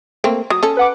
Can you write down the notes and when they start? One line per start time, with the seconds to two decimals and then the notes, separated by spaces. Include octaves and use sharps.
0.24 A3 A#3 C4
0.50 F#3 D#6
0.63 C#4 A4
0.77 B4 F#5 D6